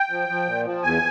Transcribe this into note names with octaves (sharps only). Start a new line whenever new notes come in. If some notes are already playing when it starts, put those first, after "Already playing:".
Already playing: G5
F3
F3
A#2
F3
E2 G#5